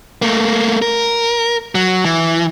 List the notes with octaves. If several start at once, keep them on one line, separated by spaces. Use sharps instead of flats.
A3 A#3
A#4
F#3
E3